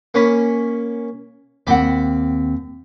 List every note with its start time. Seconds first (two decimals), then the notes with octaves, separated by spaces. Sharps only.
0.14 A#3 C#4 B5
1.67 D#2 C4 D5 F#5 G5 B5